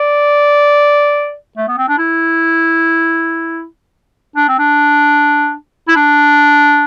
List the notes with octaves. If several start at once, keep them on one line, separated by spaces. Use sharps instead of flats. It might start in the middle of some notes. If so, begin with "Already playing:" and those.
Already playing: D5
A3
B3
C4
D4
E4
D4
C4
D4
E4
D4